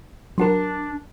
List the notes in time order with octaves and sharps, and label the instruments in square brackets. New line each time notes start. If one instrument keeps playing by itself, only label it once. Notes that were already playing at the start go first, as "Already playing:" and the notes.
[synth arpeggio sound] F#3 F#4 A#4 [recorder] D4